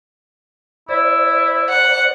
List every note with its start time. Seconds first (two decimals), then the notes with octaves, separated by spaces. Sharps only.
0.89 E4 C5 D5
1.70 F#5